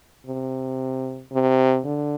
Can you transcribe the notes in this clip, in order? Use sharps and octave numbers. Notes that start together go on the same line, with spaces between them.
C3
C3
D3